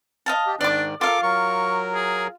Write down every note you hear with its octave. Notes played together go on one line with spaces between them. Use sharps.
D#5 F5 A5
G4
G#2 D#3 D4 D5 D6
F4 A4 A#4 F5 D6
F#3 A#4 C#6
G#4